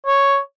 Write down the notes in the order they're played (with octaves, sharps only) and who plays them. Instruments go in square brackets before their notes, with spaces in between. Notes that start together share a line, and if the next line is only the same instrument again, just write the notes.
[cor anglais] C#5